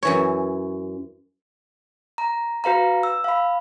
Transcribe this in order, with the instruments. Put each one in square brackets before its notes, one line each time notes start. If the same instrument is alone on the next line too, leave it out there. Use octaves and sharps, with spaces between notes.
[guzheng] F#2 E3 C#5
[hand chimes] A#5
F#4 B4 F5 A#5
E6
F5 B5